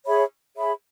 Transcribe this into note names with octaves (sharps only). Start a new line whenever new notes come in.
G#4 C#5 E5 B5
G#4 C#5 E5 B5